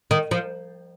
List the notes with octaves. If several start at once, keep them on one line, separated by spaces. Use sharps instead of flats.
D#3
F3